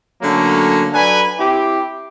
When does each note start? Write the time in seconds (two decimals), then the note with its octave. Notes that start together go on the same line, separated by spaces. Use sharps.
0.22 D3 F#3 A3 A#3 C#4
0.93 F#3 D4 A4 B4 G#5
1.39 C4 E4 G4